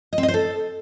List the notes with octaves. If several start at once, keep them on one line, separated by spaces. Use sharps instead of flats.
D#5
C4
D#5
C5
A4